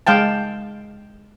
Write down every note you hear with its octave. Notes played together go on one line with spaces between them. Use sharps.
G#3 F5 G5 A5